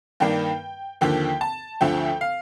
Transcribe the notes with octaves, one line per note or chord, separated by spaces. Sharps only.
G2 D#3 A#3 D4 G5
D#2 D3 F3 A#3 G5
A5
D2 D3 F3 A3 G5
F5